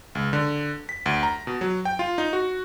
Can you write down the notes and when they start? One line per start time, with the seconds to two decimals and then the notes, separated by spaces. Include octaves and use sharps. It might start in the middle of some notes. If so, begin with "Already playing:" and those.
0.15 C#2
0.33 D3
0.89 B6
1.06 D2
1.23 A#5
1.47 B2
1.61 F#3
1.85 G5
1.99 F4
2.18 D#4
2.33 F#4